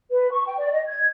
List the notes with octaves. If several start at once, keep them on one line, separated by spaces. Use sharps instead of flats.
B4
C#6
G5
D5
D#5
G#6